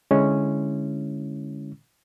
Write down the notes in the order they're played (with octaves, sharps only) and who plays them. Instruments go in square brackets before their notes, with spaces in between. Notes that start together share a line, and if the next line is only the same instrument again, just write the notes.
[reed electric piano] D3 G#3 C#4 E4